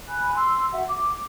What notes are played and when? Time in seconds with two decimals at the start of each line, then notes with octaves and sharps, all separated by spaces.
0.08 G#5 B5 F#6
0.35 C6 E6
0.73 F#4 E5 F#5
0.89 D6